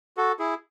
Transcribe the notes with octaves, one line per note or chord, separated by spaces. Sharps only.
F#4 A4
E4 G#4